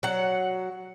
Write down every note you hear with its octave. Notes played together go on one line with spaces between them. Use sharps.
F#3 F#5